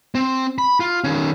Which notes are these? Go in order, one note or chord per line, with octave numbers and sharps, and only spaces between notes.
C4
B5
F4
D#3 C#4